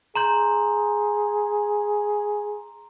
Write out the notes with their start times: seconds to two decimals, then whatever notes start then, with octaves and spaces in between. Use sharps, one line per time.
0.16 G#4 A#5 C6 G6